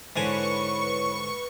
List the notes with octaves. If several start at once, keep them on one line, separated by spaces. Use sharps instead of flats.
G#2 D3 E4 B4 C#5 G#5 C#6